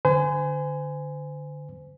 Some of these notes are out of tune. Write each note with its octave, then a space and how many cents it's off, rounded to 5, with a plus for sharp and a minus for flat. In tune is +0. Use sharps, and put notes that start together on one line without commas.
D3 +10 C5 -40 G#5 +0